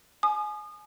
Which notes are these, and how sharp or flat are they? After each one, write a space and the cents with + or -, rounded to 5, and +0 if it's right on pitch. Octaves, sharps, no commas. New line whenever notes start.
G#5 +25 D#6 -35